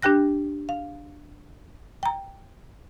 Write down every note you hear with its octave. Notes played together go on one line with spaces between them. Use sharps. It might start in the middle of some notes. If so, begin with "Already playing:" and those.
D4 G4 G5 F#6 A#6
F5
G5 A#5